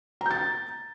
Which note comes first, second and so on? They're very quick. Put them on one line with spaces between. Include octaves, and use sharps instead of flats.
A#5 G6 A6